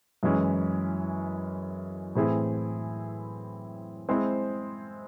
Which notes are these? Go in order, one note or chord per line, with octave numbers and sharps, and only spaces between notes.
F#2 E3 G#3 C#4 E4
A2 E3 C4 E4 G#4
G#3 C4 E4 C5